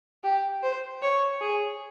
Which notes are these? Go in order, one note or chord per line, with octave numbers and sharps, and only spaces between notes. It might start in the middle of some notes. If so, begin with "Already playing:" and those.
G4
C5
C#5
G#4